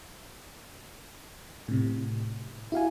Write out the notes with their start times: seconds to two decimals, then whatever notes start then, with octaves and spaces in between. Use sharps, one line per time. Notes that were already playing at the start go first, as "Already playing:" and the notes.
1.68 A2 C3
2.72 E4 F#4 F5 G#5